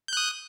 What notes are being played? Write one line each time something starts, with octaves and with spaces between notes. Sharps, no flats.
D#6 F#6 G6